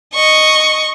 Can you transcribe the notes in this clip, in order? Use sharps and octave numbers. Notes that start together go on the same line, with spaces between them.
D#5 C#6